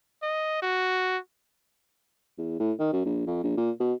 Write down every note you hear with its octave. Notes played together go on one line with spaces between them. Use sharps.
D#5
F#4
E2
A2
D#3
F#2
A#1
F2
A#1
A#2
B2